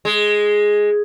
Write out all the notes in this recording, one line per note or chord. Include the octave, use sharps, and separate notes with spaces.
G#3